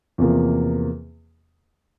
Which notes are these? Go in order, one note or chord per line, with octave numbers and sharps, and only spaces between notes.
E2 C3 F3 A#3